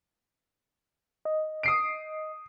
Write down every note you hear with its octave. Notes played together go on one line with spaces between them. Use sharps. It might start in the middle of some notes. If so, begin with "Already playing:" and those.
D#5
D#6 C7 D7